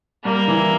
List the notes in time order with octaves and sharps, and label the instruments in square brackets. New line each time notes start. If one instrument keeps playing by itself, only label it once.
[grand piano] G3 [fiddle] A#3
[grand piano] E3